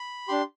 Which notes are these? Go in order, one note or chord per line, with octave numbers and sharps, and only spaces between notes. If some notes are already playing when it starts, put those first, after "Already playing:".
Already playing: B5
D4 G4 C6